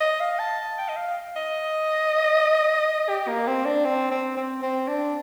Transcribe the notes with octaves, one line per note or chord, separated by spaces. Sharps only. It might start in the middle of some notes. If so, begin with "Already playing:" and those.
D#5
F5
A5
G5
D#5
F5
D#5
G4
A#3
C4
D4
C4
C4
C4
C4
D4